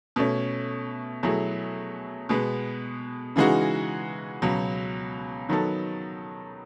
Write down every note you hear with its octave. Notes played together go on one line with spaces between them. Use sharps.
B2 A3 C#4
B2 F#3 A3 E4 G#4
B2 G#3 B3
C#3 E3 G#3 D#4 F#4
C#2 B2 F#3
D#3 F#3 B3 D#4 A4